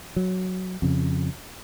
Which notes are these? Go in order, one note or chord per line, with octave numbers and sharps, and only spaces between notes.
F#3
F2 C#3